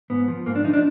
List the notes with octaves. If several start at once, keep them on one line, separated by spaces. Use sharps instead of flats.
G#2 B3
F3
G#2 A#3
D4
F3 D#4
D4